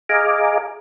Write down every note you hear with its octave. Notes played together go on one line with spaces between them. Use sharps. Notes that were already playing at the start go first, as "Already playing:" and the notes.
G#4 D#5 F5 G#5 A#5 D6